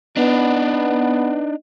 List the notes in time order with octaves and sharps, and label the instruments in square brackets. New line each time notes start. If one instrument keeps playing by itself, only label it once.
[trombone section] B3 [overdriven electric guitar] D4 D#4